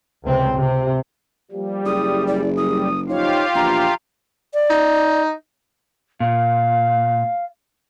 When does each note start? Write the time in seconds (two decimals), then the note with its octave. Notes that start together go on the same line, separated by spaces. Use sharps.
0.24 C#2 C3 C4
0.56 C3
1.52 F3 G3 A#3 G4
1.85 F#1 E4 G#4 D#6
2.27 D5
2.56 G3 D#6
3.09 F3 D#4 F4 G4 C#5 F5
3.55 A#1 E2 A#5
4.54 D5
4.70 D#4
6.20 A#2 F5